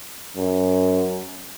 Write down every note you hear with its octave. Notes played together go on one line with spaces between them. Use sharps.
F#2